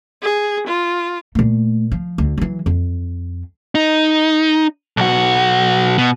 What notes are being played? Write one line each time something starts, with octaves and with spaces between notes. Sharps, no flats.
G#4
F4
A#2 A3
F3
D2
E3 F#3
F2
D#4
B1 F#4
B2